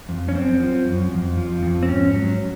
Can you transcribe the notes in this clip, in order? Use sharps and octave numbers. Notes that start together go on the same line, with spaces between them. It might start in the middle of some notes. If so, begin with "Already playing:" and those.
F2
C#4
F#2 C4
F3
F#2
F2
F3
F2
C4
G#2 C#4
F#3